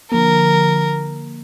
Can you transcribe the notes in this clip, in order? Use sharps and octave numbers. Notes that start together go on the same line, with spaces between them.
D3 F3 A#3 A#4